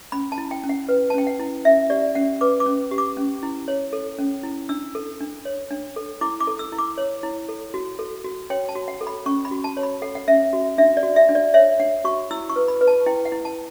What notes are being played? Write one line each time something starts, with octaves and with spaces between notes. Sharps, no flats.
C#4 B5
A5
E4
G5
C#4
F#5
B4
A5
C#4 G5
F#5
E4
C#4 E5
G4 D5
C#4 F#5
B4 D6
D6
C#4
G4
D6
C#4
E4
C#5
A4
C#4
E4
D4 E6
A4
D4
C#5
D4
A4
E4 D6
D6
A4
E6
E4
D6
C#5
E4
A4
F#4
A4
F#4
C#5 G5
A5
F#4
F#5
A4
B5
C#4 C#6
B5
F#4
A5
C#5
B5
A4 F#5
F#5
C#4 E5
F#4
D4 E5
D5
F#4
E5
D4
D5
C#5 E5
D4 F#5
F#4 C#6
E4 E6
C#6
B4
B5
B4
A5
E4 G5
F#5
E4
A5